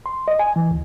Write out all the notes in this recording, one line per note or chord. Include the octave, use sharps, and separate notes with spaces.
C6
D#5
G#5
E3
D2